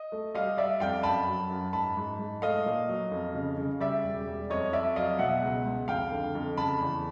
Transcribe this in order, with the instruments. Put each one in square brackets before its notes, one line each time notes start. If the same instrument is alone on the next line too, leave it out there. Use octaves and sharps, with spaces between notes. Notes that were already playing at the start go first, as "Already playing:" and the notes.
Already playing: [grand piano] D#5
A3
G3 D#5 F5
G3 D5 E5
F2 F5 G5
F#2 A5 B5
F#3
F#2
G#2 A5 B5
G#2
G#2
A3 D#5 F5
A#2
F#3
F2
C#3
C#3
G3 D5 E5
E1
G3
F2 C#5 D#5
F2 D5 E5
F#3 D#5 F5
B2 E5 F#5
C#2
C#2
F2 F5 G5
D3
F2
C#3 A5 B5
E2